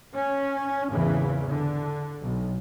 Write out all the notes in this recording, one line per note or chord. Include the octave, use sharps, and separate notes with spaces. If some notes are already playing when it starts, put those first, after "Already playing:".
C#4
G#1 E2 C#3 E3
D3
B1